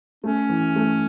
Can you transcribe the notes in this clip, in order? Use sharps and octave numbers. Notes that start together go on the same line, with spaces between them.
A3 C#4
E3
A3